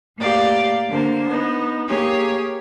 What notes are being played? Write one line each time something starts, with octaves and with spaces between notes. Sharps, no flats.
A2 A#3 G4 D5 F5
D3 A#3 C5
B3 D#4
A#3 G4 G#4 C#5 G#5